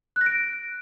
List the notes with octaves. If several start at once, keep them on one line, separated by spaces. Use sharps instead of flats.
F#6
A#6
D7